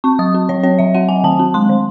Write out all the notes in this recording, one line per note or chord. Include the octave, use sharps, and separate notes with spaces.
C4 C#6
F#3 D#6
C4
F#3 C#5
C4 C#5
F#3 E5
C4 F#5
F#3 G#5
D#3 A5
C4
G#3 C6
D#3